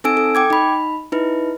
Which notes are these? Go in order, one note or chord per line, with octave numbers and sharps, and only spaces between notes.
C4 D#4 A4 G#5 E6 D7
A4
G5 D6 G#6
D#4 B5
D#4 E4 B4